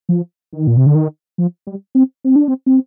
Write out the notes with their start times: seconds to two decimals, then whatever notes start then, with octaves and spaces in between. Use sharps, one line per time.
0.09 F3
0.53 D#3
0.67 A#2
0.77 C3
0.86 D3
0.95 D#3
1.38 F3
1.67 G3
1.95 C4
2.24 C4
2.36 D4
2.48 C4
2.66 C4